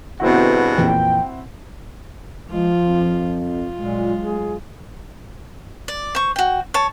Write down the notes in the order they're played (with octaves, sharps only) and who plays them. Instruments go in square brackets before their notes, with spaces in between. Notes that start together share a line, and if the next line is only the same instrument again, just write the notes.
[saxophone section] E2 G2 B2 [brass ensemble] D3 [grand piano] C4 E4 F#4
[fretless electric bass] F2 A#2 E3 [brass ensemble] G5
[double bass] F3 [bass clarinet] G#3 [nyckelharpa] F4
[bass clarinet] F2
[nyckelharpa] F4
[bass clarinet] A#2 [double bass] F#3 G#3
[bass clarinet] G#4
[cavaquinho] D5
C5 C#6
F#4 G5
C#5 A5